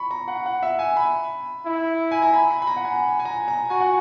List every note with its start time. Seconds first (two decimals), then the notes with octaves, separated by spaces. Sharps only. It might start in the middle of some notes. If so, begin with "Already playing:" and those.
Already playing: B5 C#6
0.11 A#5
0.28 F#5
0.46 F#5
0.63 E5
0.79 G#5
0.97 B5
1.66 E4
2.11 G#5
2.22 A#5
2.34 B5
2.50 B5
2.62 B5
2.67 A#5
2.76 F#5
2.85 G#5
3.19 G#5
3.25 A#5
3.48 A#5
3.70 F#4 G#5
3.81 F#5